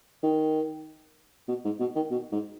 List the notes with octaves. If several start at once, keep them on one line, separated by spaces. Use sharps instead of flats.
D#3
B2
G#2
B2
D#3
B2
G#2